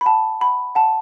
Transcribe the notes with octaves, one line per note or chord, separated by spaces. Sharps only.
B5
F#5 A5
F#5 B5
F#5 A5